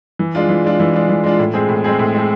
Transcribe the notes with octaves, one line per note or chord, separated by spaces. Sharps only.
E3
G#3 D4 F4
E3
G#3 D4 F4
E3
G#3 D4 F4
E3
G#3 D4 F4
A2
G#3 C4 G#4
A2
G#3 C4 G#4
A2
G#3 C4 G#4